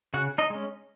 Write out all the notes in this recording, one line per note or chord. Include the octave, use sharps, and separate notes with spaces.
C#3 F#4 F#5
D#4 D#5
G#3 C#4